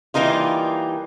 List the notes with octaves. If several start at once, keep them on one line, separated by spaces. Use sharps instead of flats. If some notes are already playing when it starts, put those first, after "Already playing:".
E3 G3 A#3 D#4 F4